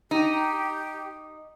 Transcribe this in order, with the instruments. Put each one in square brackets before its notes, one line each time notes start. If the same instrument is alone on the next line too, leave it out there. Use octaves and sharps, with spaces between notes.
[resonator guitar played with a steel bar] D#4 [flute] G4